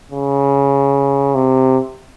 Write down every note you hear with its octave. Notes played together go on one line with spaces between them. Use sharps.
C#3
C3